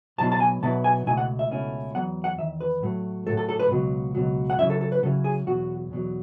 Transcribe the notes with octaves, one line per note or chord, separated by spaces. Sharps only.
B1 B2 F#3 B3 E4 A5
A5
G#5
B1 B2 F#3 B3 E4 A5
G#5
C#2 B2 A3 E4 G#5
F#5
E5
C#2 B2 A3 C#4 E4
E2 D#3 F#3 B3 F#5
F#5
E2 D#3 E5
B4
A2 F#3 A3
A2 F#3 A3 A4
A4
A4
B4
C#2 B2 F#3
C#2 B2 F#3
F#5
C#3 F#3 C#4 E4 E5
A4
A4
B4
C#3 F#3 C#4 E4 A4
G#4
E2 B2 F#3 F#4
E2 B2 F#3